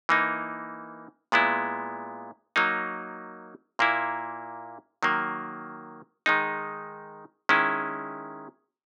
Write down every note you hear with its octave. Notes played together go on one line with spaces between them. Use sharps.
E3 A#3 D#4
A#2 G#3 B3 E4
F#3 A#3 D#4
A#2 A#3 E4
D#3 F#3 A#3
D#3 G#3 D#4
D#3 G#3 C#4 E4